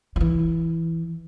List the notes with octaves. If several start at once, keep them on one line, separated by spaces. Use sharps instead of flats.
F3
E3